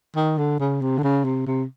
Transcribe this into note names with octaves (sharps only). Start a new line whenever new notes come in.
D#3
D3
C#3
C3
D3
C#3
C3
C3